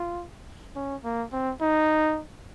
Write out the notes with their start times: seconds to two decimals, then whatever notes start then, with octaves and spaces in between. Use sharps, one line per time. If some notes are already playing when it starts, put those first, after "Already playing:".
Already playing: F4
0.76 C#4
1.04 A#3
1.32 C4
1.61 D#4